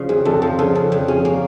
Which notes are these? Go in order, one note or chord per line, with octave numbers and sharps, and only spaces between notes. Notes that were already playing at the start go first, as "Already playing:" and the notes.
Already playing: C#3 F3
F2 G#4
F2 A4
F3 A4
C#3 A4
F2
F2
C#4 G#4
A#3